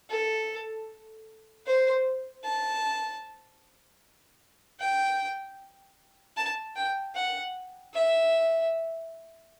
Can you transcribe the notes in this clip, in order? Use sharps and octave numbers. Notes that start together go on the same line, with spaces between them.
A4
C5
A5
G5
A5
G5
F#5
E5